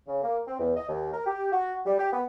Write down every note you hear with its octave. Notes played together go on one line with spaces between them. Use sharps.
C#3
A#3
C4
E2
D#5
D#2
A#4
G4
F#4
G3
G4
B3